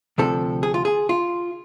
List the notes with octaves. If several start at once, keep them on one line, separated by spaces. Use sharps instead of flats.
D2 C3 F3 A4
G#4
F4
G#4
F4